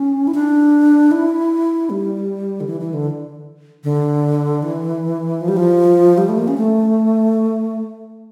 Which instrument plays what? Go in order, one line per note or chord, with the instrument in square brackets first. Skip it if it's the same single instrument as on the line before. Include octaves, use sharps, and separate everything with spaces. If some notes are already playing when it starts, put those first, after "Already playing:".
Already playing: [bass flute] C#4
E4
D4
E4
G3
D3
E3
E3
D3
D3
E3
F3
G3
F3
G3
A3
A#3
C#4
A3